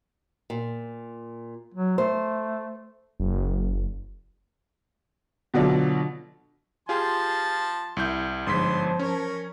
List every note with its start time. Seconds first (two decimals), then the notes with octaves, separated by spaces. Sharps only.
0.50 A#2
1.74 F#3
1.98 A3 C5
3.20 F#1
5.54 B2 D3 F#3 D4 F4 A4
6.89 F3 F4 G4 G#4 A5 C6
7.97 C2 E4 G6
8.46 G1 G#2 F3 C6 B6
8.99 C#4 A#4 C#5